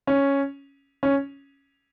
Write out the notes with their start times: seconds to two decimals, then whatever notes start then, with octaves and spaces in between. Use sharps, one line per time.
0.07 C#4
1.03 C#4